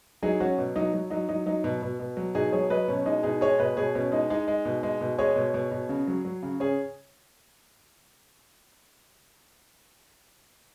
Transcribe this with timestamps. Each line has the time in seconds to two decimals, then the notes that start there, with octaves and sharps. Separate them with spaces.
0.23 F#3 D#4 G#4
0.40 F#3 C#4 F#4
0.58 B2
0.76 F#3 D#4
0.94 F#3
1.10 F#3 D#4
1.29 F#3 D#4
1.46 F#3 D#4
1.64 B2
1.83 B2
2.00 B2
2.17 F#3
2.35 B2 D#4 G#4
2.52 F#3 G#4 C#5
2.70 F#3 B4 D#5
2.88 B2 C#4
3.06 G#3 D#4
3.23 B2 D#4 G#4
3.41 G#3 G#4 C#5
3.59 B2 B4 D#5
3.77 B2 G#4 C#5
3.95 B2 C#4
4.12 G#3 D#4
4.30 G#3 D#4
4.48 G#3
4.65 B2
4.83 G#3
5.01 B2
5.18 G#3 G#4 C#5
5.36 B2
5.54 B2
5.71 B2
5.89 C#3
6.07 F#3
6.25 F#3
6.43 C#3
6.60 C#3 G#4 C#5